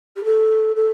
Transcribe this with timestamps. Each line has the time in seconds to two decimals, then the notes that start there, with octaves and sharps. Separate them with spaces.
0.16 G4
0.24 A4
0.76 A4